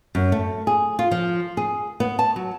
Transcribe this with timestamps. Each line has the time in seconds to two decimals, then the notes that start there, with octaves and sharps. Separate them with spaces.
0.15 F#2
0.32 A3
0.67 G#4
0.99 F4
1.11 F3
1.57 G#4
2.00 B3
2.19 A5
2.36 F#3